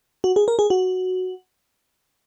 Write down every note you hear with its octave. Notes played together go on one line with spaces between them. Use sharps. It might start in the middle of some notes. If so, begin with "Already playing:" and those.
F#4
G#4
A#4
G#4
F#4